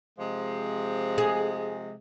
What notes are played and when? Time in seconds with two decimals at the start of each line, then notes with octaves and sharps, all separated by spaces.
0.19 C3 F3 G#3
1.18 G#4